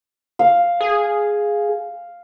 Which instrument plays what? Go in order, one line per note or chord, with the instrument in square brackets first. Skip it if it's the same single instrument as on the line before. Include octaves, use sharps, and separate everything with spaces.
[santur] F5
[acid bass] G#4